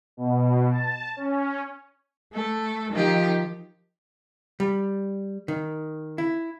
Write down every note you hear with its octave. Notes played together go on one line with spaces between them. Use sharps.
B2
A5
C#4
A3 A4
D#3 F3 D#4 F4 G4
G3
D#3
E4